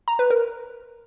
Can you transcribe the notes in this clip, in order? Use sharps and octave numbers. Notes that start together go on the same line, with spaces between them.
A#5
B4
A#4